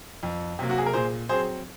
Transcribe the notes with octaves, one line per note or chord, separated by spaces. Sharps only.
F2
C3 F#3 A#3
F#4
G#4
A#4
A#2 G#4 C5
F#3 C4 G#4 C5